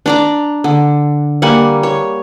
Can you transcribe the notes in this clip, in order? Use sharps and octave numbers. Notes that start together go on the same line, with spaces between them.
D4 D5 A#5
D3
G3 A#3 F#5 G#5
C#5